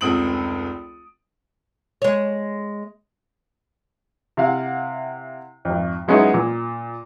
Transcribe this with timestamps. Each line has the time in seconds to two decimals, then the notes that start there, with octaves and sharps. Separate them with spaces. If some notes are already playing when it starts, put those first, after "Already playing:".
0.01 F1 C#2 C4 D#6 D7 F#7
2.02 G#3 C#5
4.37 C3 E4 F5 F#5
5.65 G#1 F2
6.08 F#3 G#3 B3 C#4 D#4 E4
6.34 A#2